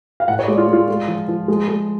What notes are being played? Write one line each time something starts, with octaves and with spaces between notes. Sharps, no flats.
F5
A2 F#5
C#5
D5
G#3
F4
G#3
F4
G#3
F3
F3
G#3
G#3